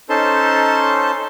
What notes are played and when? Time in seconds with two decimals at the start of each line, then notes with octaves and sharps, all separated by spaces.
0.09 C#4 D#4 A4 C5 A5 C6